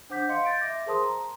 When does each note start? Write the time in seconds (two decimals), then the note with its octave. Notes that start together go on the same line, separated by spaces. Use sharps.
0.10 D4 C5 F#5 D6 G6 B6
0.28 D#5 F5 C6 C#7
0.45 G6 A6 D7
0.59 E5 D6 A#6
0.86 G#4 A#4 C5 A5 C6 D#6
1.04 A#5